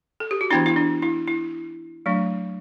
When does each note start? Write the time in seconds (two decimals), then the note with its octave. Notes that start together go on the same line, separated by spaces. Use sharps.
0.20 A4
0.31 G4
0.41 F#4
0.50 E3 B3 D4 E4
0.66 E4
0.76 D4
1.02 E4
1.28 E4
2.06 F#3 A3 D4